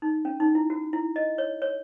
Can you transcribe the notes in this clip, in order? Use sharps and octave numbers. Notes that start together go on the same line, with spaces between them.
D#4
C#4
D#4
E4
F#4
E4
D#5
C#5
C#5